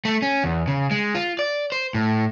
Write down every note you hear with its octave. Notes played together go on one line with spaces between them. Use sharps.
A3
C#4
E2
C#3
G#3
F4
D5
C5
A2